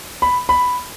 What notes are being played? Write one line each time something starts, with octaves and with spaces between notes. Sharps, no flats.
B5
B5